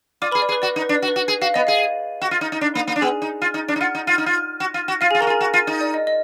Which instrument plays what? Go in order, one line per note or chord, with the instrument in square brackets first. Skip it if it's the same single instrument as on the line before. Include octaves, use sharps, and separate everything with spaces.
[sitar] F4 [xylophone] D5 D6
[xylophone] B4 B5
[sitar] G#4
[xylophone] D5
[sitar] G#4
[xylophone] B4
[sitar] F#4 [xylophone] D5
[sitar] D#4
[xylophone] B4
[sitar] D4
[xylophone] D5
[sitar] F#4
[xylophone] B4
[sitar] F#4
G#4
[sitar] F#4 [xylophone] F5
[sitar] B3 [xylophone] D#5
[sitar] G#4 [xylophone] F5
[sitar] F#4
F4
D#4
D#4
D4
A#3
A#3
D4
[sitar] B3 [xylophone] G#4 G#5
[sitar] D#4
F4
D#4
D4
D#4
[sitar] F4 [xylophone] F#5
[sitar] D#4
F4
D#4
F4
F#4
F4
F#4
[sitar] F4 [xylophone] F5
[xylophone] G#4 G#5
[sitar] F4
[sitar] F#4 [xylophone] A#4 A#5
[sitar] F4
[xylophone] G#4 G#5
[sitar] F#4
F4
D#4
[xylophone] D5
D#5
D#5